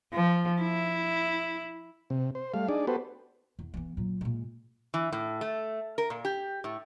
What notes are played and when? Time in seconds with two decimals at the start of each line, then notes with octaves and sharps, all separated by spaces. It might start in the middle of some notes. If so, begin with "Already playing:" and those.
0.13 F3
0.61 E4
2.10 C3
2.35 C5
2.54 G3 A3 F5
2.69 D4 D#4 G#4 D5
2.87 B3 F#4 G4 A4 B4 C5
3.59 E2
3.74 E3 B3
3.97 A#2 F#3
4.21 A#2 G#3
4.94 E3
5.12 A2
5.41 A3
5.98 A#4
6.10 A#2
6.25 G4
6.64 A2